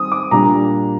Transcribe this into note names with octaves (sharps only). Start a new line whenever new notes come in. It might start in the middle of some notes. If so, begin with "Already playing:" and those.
Already playing: D#3 G3 C4 D#6
D6
A#2 G3 A#3 D4 A#5